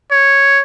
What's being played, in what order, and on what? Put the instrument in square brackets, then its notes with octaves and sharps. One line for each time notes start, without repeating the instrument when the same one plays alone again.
[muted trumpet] C#5